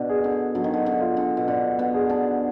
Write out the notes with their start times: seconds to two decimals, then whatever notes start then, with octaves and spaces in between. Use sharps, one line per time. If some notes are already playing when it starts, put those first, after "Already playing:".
Already playing: B2 D4
0.09 G#4
0.24 D3
0.55 D3 F#3
0.64 D#3
0.74 D3
0.86 D3
1.01 F4
1.17 D3
1.37 B2
1.48 D3 D4
1.79 B3
1.94 G#4
2.10 D4